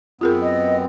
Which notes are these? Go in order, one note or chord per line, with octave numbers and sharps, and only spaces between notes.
F#2 B3 C4 F4 G#4 A#4
D#5